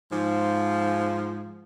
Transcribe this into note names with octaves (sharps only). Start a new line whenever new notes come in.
G#2 F3